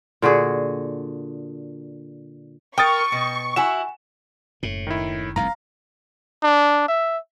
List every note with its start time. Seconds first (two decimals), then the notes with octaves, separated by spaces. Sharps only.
0.22 A#2 D3 F#4 G#4
2.78 A#4 G5 C#6 D#6 A6
3.12 B2
3.56 E4 F#4 F#5 G#5 E7
4.63 F#1 A2
4.87 D#3 E4
5.36 F1 C2 G2 F5 A#5
6.43 D4
6.88 E5